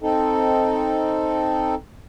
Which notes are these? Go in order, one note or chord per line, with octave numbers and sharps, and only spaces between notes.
C4 D#4 A4